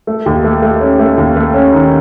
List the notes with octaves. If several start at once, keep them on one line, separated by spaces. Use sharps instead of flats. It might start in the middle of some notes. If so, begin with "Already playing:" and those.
A3
D#2
A3
A3
C#4
A3
D#2
A3
C#4
D#3